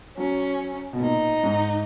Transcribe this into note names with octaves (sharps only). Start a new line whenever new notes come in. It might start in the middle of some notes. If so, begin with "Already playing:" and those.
F#3 C#4
B2
A#2 D#4
G#2